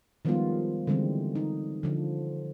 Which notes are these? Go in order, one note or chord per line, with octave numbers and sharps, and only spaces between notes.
D#3 F3 G3 G#3 B3 F4
D3 E3 G3 G#3 C4
D#4
D3 F3